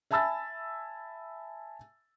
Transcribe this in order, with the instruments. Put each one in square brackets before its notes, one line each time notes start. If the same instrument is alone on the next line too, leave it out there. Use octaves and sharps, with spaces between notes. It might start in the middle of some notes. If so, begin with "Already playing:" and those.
[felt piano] E5 G#5 A5 B5 E6 A6